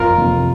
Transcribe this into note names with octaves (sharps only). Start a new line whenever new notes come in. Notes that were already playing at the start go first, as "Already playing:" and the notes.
Already playing: F2 F4 A#4
C3 F3